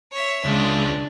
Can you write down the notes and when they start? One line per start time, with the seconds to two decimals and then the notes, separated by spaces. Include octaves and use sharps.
0.12 C#5 E5
0.45 C#2 G#3 D4